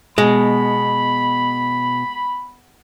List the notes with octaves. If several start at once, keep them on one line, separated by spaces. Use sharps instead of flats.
B2 G#3 B5